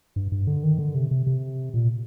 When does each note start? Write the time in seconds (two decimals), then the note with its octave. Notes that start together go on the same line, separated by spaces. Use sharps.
0.16 G2
0.32 G2
0.47 D3
0.63 D#3
0.78 D3
0.95 C3
1.11 C3
1.27 C3
1.74 A#2